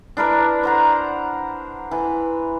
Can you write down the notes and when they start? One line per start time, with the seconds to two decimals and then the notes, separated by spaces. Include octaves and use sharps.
0.17 D4 E4 A#4 B4
0.63 C5 F#5 A#5
1.91 E3